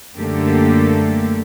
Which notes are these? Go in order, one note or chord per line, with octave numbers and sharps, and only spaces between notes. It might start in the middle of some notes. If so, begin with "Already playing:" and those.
F#2 D3 A3 A#3 G4 A4